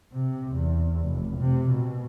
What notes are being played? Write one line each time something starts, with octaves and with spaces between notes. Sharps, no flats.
C3
E2
F1
C3
B2